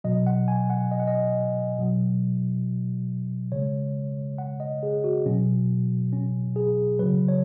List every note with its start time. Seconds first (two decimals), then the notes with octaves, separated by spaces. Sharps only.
0.04 B2 F#3 D#5
0.27 F#5
0.48 G#5
0.70 F#5
0.91 D#5
1.00 F#5
1.07 D#5
1.78 B2 F#3
3.52 C#3 G#3 C#5
4.38 F#5
4.60 D#5
4.83 G#4
5.04 F#4
5.26 B2 F#3 C#4
6.13 C#4
6.56 G#4
6.99 C#3 F#3 B4
7.28 C#5